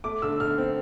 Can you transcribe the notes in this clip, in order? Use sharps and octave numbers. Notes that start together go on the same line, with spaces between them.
A3 D6
D3 E6
D3 F6
C4